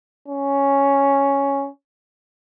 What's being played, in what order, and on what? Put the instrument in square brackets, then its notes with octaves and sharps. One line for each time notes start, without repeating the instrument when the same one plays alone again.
[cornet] C#4